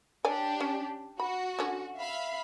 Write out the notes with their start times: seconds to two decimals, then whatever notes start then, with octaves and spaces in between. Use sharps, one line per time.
0.25 D4 G4 C#5 D5 G#5
0.60 C#4
1.20 F#4 B5
1.59 D3 C#4
1.97 E5 F5 B5